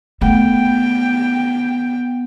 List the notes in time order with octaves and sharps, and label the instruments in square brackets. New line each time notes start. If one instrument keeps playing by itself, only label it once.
[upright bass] A3 [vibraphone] B3 F#5 [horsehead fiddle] G5